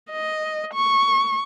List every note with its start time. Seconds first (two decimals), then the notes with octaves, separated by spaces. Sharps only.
0.11 D#5
0.74 C#6